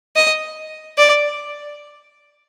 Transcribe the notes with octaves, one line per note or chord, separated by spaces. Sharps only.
D#5
D5